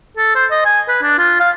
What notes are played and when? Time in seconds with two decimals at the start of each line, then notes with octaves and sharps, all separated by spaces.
0.17 A4
0.35 C5
0.51 D#5
0.65 G#5
0.89 B4
1.03 D4
1.19 F4
1.40 F5